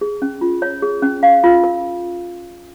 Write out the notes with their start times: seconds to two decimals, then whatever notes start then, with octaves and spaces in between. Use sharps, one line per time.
0.01 G#4
0.22 C#4
0.41 F4
0.62 C#5
0.82 G#4
1.02 C#4
1.23 F5
1.44 F4
1.64 A#4